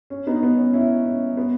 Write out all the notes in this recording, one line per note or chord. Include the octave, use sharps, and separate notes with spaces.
C#4
B3 D#4
B3
C#4
C#4 E4
C#4
B3